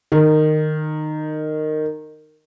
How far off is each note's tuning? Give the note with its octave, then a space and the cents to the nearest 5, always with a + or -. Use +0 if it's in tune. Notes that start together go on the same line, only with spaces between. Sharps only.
D#3 -15